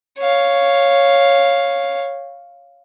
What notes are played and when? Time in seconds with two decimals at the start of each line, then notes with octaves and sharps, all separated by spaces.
0.18 C#5 F5